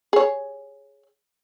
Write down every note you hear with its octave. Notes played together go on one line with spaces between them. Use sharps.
G#4 C#5